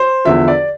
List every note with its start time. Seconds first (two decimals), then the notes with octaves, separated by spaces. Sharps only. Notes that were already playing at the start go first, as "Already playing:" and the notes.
Already playing: C5
0.25 E2 D3 F3 E5
0.48 D5